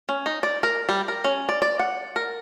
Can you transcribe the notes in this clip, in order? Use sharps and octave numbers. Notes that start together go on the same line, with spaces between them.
C#4
D#4
D5
A#4
G3
A#4
C#4
D5
D5
F#5
A#4